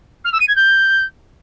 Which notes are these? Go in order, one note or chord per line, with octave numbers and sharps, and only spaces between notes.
F6
E6
D#7
G#6
G6